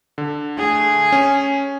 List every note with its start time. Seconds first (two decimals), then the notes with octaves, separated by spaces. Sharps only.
0.18 D3
0.57 A3 G#4
1.12 C#4